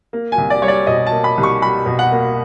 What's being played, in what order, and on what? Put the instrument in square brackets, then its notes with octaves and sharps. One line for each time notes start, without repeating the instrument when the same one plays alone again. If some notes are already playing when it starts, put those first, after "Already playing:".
[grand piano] A#3
G#5
C2
D5
G3 C#5
D5
B2 D#5
A5
A#3
B5
C2
C#6
G3 B5
B2
F#5
A#3